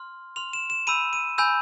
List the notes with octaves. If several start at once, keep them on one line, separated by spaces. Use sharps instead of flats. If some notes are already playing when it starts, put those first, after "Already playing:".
Already playing: C6 F6
C6 F6 F7
E7
E7
G#5 B5 E6 G6 D#7
D#7
G#5 B5 E6 G6